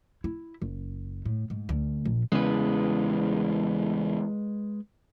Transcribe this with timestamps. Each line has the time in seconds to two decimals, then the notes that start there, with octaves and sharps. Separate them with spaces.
0.24 E4
0.62 F#1
1.25 A2
1.50 G#2
1.69 D2
2.06 A#1
2.32 E2 C#3 E3 G#3 B4